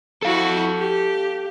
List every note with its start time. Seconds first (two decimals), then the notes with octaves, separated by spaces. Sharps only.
0.23 E4 F#4 A4 F5
0.79 G4